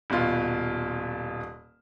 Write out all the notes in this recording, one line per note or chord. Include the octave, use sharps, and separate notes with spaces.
D#1 B2 F4